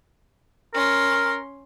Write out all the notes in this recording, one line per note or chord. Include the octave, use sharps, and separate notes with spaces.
C#4 A#4 C6